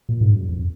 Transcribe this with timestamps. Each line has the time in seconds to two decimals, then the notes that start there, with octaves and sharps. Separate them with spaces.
0.09 A#2
0.21 G#2
0.33 F#2
0.49 F2